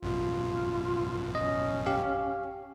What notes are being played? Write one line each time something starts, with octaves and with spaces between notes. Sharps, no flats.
A1 F#2 B2 F4
C#4 D#5
G4 F5